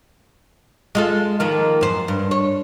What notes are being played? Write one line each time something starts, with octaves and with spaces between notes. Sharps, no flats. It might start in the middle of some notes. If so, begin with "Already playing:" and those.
G#3 F4 A4
D#3 F3 A#3
F#2 C5
G2
C#5